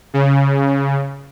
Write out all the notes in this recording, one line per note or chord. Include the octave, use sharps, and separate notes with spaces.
C#3